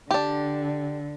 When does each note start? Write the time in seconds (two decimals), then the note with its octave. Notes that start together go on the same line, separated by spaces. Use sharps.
0.11 D3 D4 G4